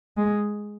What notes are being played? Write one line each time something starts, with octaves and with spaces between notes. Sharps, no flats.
G#3